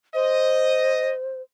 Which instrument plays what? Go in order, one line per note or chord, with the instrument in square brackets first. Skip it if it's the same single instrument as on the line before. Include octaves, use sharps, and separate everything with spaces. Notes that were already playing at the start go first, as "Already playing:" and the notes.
[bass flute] C5 [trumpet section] D#5